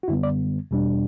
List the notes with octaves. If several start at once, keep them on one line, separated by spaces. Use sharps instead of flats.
F#4
F#2 D3 G3 B3 E4
D5
E2 B2 G3 D4